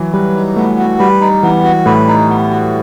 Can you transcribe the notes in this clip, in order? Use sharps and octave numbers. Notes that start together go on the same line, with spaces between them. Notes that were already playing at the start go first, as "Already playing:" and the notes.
Already playing: E3 F#3
G3 B4
D#4
A3 B3
F#4
G3 B4
D#4
E3 B3
F#4
A2 B4
D#4
B3
F#4